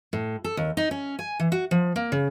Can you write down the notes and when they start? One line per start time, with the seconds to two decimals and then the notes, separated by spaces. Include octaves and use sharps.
0.13 A2
0.44 A4
0.57 D#2
0.77 D#4
0.91 C#4
1.19 G#5
1.40 E3
1.52 F#4
1.71 F3
1.96 A#3
2.12 C#3